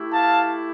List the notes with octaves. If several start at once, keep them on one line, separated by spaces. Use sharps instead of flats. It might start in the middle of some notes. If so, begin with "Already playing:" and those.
Already playing: A3 E4 G4
F5 A5